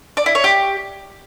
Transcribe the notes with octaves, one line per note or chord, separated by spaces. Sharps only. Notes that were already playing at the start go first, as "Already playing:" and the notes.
D5
E4
C#5
G4